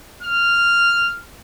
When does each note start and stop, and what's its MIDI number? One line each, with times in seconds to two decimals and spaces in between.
0.23 1.20 89